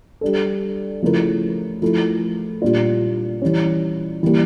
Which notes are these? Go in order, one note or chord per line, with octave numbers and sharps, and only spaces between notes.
G3 D4 A4
C#3 F3 A3 E4 A#4
F3 A3 E4 A4
A#2 G3 D4 F4
E3 G3 C#4
E3 G3 A#3